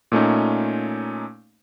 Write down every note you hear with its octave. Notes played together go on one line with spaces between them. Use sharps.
A#2 A3 C#4 D#4